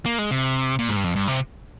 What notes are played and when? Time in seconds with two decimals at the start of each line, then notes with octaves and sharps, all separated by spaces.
0.06 A#3
0.19 G#3
0.31 C3
0.79 A#2
0.89 G#2
0.96 G2
1.04 F2
1.16 G2
1.28 C3